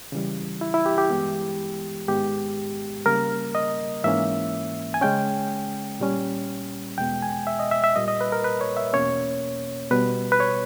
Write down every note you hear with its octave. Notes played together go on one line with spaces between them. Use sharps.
C#3 E3 G3
E4
E4
G4
G4
G2 E3 G#3 B3
G#2 D#3 G#3 B3 G4
C#3 G3 A#3 A#4
D#5
G#2 E3 A#3 C#4 E5
G#5
C#3 G#3 C#4 G5
A#2 G3 C#4
E2 B2 G#3 B3 G5
G#5
E5
D#5
E5
E5
A#2 G3 A#3 D#5
D#5
B4
A#4
B4
C#5
E5
E2 B2 A#3 C#4 C#5
B2 G3 B3 B4
B4
C#5